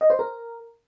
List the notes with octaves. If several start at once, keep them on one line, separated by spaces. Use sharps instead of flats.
D#5
C5
A#4